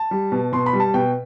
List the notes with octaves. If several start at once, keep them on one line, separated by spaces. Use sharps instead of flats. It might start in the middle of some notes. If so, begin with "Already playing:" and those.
Already playing: A5
G3
B2
B2 C6
B5
G3
A5
B2 G5